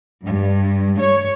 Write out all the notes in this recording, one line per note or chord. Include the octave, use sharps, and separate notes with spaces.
G2
C#5